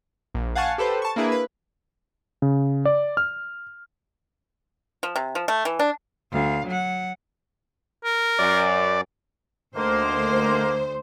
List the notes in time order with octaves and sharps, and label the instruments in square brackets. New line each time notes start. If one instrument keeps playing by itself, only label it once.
[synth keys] A#1
F5 F#5 G#5 A5 C#6
G4 A4 B4 C5
A5 C#6
A#3 D4 E4 G#4 B4
B4
[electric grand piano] C#3
D5
F6
[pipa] F3
C3
F3
A3
E3
D4
[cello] D2 F5
F#3 F#5
[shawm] A#4
[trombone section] F#2 [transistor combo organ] D5
[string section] D2 C5 [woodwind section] D3 D#3 A#3